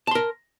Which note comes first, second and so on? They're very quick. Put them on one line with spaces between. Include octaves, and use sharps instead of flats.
A5 C6 A#4